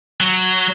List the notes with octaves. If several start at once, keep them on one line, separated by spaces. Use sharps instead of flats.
F#3